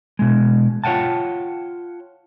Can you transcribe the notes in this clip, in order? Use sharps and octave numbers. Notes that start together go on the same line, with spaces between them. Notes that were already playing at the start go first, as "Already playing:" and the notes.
B2 G#3
F4 C#5 F#5 G5 A5